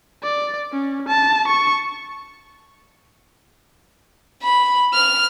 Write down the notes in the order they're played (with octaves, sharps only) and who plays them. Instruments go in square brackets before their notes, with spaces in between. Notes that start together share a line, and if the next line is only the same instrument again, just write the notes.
[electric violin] D5
C#4
A5
C#6
[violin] B5
F6